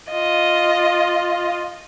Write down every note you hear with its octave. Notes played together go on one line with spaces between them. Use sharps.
F4 D#5